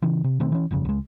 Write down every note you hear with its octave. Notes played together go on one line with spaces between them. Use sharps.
C#3 E3
C3
B2 D#3 A3 C4
E3 C#4
G1 F2 C#3
C#2 G#3